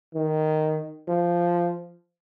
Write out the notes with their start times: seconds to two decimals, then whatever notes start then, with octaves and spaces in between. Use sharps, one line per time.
0.15 D#3
1.08 F3